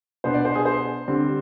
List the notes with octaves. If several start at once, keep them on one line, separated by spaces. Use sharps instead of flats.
B2 B3 D4 C5
D5
C5
G#4
C5
D3 G3 C4